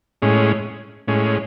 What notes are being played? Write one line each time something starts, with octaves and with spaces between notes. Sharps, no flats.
A2 G#3 C#4
A2 G#3 C#4